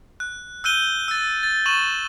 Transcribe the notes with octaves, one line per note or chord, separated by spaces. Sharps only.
F#6
E6 F#6 G6 D#7 G7
E6 A6
A6
C#6 D#7 E7 F#7